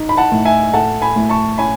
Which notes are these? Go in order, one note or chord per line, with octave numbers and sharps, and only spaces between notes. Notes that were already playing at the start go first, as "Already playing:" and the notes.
Already playing: D#4
B5
F#5 A5
A2
E5 G#5
A3 F#5 A5
G#5 B5
A2
A5 C#6
C#4 G#5 B5